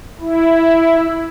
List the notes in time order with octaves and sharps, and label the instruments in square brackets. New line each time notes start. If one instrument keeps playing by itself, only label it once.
[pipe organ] E4